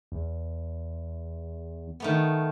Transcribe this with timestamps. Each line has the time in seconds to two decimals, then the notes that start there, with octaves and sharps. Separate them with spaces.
0.12 E2
2.00 D#3 A3 B3